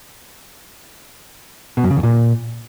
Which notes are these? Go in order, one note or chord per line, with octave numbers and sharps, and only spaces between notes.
B2
F#2
C#3
E2
A#2